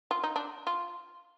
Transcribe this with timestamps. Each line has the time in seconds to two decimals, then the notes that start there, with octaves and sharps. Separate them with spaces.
0.11 F4
0.23 D#4
0.36 D4
0.67 F4